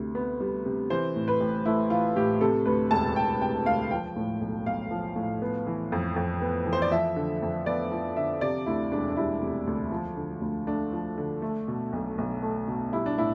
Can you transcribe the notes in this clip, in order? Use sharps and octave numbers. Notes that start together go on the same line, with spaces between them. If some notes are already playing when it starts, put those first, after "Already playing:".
Already playing: D2 C3
B3
G3
C3
E3 C5
A2
B4
A1
A3 E4
E3 F4
A2 G4
C3 A4
D2 B4
E1 A5
E1 G5
C3 G5
D2 F5
F3 G5
A2
B1
B1 F5
F3
A2
B3
E3
F2
F2
B3
E3
C5
D5
F3 E5
D3
F2
B3 D5
F3
D3 E5
C3 D5
D2 E4
E1 D4
D4
G3 E4
C3
D2
F3
D3
D2
A3 D4
F3
D3
A3
B2
B1
B1
A3
B2
G3 E4
D4
A2 E4